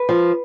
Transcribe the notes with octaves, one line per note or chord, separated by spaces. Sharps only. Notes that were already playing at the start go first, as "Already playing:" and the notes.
Already playing: B4
F3